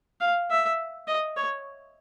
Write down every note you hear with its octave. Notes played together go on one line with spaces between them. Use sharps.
F5
E5
D#5
C#5